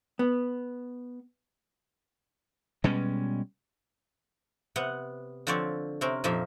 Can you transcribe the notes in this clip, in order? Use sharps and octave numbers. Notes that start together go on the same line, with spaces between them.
B3
B2 G3 G#3 C#4
C3 B3 F#5
D3 F3 C4 C#5 D5
C3 C4 C#4 A#4
F2 A#2 F3 A#3 D#4 E5